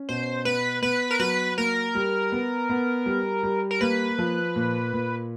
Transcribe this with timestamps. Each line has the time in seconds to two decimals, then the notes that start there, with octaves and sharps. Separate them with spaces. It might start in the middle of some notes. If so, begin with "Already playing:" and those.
Already playing: C#4
0.09 B2 C5
0.45 B3 B4
0.82 B3 B4
1.11 A#4
1.20 F#3 B4
1.58 A#3 A#4
1.95 G3
2.32 B3
2.70 B3
3.06 G3
3.43 G3
3.71 A#4
3.81 A#3 B4
4.19 F3
4.56 A#2
4.93 A#2